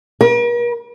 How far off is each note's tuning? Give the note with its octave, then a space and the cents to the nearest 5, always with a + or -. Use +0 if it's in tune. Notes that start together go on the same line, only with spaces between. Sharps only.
A#4 +45